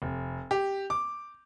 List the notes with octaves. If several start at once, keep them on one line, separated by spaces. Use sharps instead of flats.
F1
G4
D6